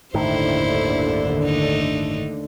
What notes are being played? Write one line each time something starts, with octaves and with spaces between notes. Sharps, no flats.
G1 D#2 A2 D3 D#3 E4 C5
A3 D4 D#4